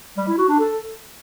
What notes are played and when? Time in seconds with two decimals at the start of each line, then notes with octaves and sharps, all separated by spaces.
0.17 G3
0.28 E4
0.38 F#4
0.49 D4
0.59 A4